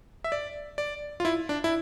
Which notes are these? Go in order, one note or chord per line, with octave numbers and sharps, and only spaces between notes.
E5
D5
D5
F4
E4
D4
E4